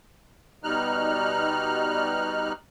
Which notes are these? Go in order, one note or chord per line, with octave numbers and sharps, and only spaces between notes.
B2 G3 D#4 F6 F#6